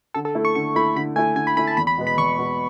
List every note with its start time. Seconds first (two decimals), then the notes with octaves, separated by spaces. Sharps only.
0.14 D3 A4
0.25 A4
0.35 A3 E4
0.45 C#6
0.55 D3 C#6
0.75 A3 E4 B5
0.96 D3 B5
1.16 A3 E4 G#5
1.36 D3 G#5
1.47 B5
1.57 A3 E4 B5
1.67 A5
1.77 E2 B5
1.87 B5
1.97 B2 G#3 B3
2.07 B5
2.17 E2 C#6
2.38 B2 G#3 B3